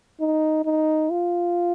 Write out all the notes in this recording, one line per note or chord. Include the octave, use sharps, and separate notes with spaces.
D#4
D#4
F4